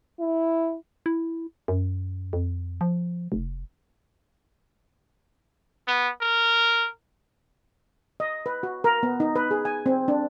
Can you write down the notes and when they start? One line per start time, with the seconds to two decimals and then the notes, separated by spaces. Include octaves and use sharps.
0.20 E4
1.06 E4
1.68 F#2
2.33 F2
2.81 F3
3.32 F1
5.88 B3
6.22 A#4
8.20 D#5
8.46 B4
8.63 F#4
8.84 A#4
9.03 B3
9.20 D#4
9.36 B4
9.51 G#4
9.65 G#5
9.86 C4
10.08 D4